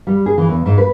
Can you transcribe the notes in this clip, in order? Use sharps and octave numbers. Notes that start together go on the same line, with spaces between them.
G3
G#4
E3
E2
G#2
B4